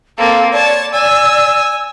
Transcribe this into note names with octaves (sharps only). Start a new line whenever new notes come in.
A#3 C4 A4 F5
C#5 D5 A5
G#5 E6